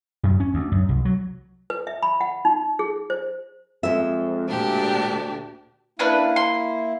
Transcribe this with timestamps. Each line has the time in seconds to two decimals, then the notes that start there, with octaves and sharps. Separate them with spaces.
0.23 F#2
0.40 C#4
0.54 D2
0.72 F#2
0.89 C2
1.05 F#3
1.70 B4
1.87 E5
2.03 B5
2.21 F#5
2.45 D#4
2.79 G#4
3.10 C5
3.83 F2 G#3 E5
4.49 D2 A#2 D4 G4
5.99 A#3 C#4 D4 E4 B4
6.36 C6